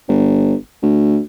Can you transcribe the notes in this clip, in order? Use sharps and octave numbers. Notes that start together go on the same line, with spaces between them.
G1
D2